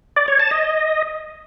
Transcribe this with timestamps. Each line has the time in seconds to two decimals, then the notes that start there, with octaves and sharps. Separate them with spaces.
0.16 D5
0.28 C#5
0.40 A5
0.51 D#5